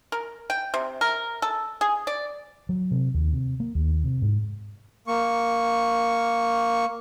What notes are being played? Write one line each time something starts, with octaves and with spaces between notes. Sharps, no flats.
A#4
G5
C3
A#4
A4
G#4
D5
F#3
C3
D#2
C3
A#3
D#2
C3
G#2
A#3 C#6